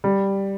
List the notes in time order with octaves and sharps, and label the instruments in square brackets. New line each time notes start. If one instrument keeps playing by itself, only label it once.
[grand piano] G3